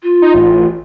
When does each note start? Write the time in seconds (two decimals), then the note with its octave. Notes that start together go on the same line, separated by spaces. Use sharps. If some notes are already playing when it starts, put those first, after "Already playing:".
0.03 F4
0.22 D#4
0.34 A1